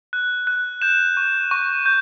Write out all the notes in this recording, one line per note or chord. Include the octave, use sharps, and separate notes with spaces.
F#6
F#6
G6 E7
C#6
C#6
G6